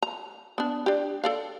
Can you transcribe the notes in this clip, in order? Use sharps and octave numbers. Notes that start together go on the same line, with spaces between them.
A#5
B3 D4
D4 G4
A4 D5 F5